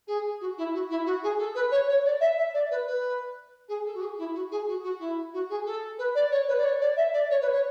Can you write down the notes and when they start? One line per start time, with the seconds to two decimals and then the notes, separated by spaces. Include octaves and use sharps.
0.07 G#4
0.40 F#4
0.57 E4
0.74 F#4
0.90 E4
1.05 F#4
1.23 G#4
1.38 A4
1.55 B4
1.71 C#5
1.88 C#5
2.05 D5
2.20 E5
2.37 E5
2.54 D5
2.70 B4
2.87 B4
3.68 G#4
3.85 A4
3.94 F#4
4.01 G#4
4.18 E4
4.34 F#4
4.51 G#4
4.67 F#4
4.83 F#4
4.99 E4
5.33 F#4
5.49 G#4
5.66 A4
5.98 B4
6.15 D5
6.31 C#5
6.48 B4
6.57 D5
6.63 C#5
6.81 D5
6.97 E5
7.13 D5
7.30 C#5
7.41 B4
7.52 C#5